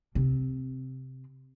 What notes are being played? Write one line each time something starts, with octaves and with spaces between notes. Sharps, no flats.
C3 C4